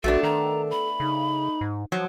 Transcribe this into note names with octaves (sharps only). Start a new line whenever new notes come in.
A#1 A3 B3 D4 F#4 A4
D#3 A#5
B5
C#3 D#4
G#2
F3 F#3